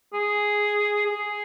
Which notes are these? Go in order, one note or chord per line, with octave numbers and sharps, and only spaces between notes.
G#4
G#4